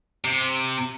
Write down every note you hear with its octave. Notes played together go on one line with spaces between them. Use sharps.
C3